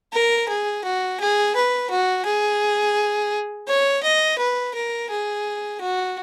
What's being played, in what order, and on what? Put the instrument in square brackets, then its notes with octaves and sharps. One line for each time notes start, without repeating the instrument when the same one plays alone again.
[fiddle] A#4
G#4
F#4
G#4
B4
F#4
G#4
C#5
D#5
B4
A#4
G#4
F#4